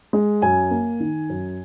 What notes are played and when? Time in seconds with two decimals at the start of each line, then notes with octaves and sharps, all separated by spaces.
0.13 G#3
0.42 F#2 G#5
0.71 A#3
1.00 D#3
1.29 F#2